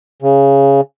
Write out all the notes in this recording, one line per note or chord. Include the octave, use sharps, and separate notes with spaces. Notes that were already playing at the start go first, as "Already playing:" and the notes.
C#3